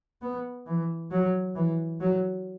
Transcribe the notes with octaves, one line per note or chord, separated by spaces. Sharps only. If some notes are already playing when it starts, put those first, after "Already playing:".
B3
E3
F#3
E3
F#3